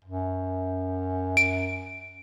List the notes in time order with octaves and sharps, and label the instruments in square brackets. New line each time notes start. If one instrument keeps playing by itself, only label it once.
[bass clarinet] F#2
[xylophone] D7